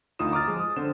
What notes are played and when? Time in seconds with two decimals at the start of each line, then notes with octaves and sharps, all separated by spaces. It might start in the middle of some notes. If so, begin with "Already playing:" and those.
0.19 D2 D#4 F4 D#6 E7
0.32 A#5 D6 D#6 F6 A6
0.47 F3 G#3
0.59 D#6
0.76 D3 C4 C5 E7